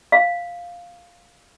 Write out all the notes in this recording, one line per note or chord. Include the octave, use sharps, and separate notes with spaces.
F5